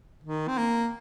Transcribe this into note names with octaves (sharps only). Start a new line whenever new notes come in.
D#3
C4
A#3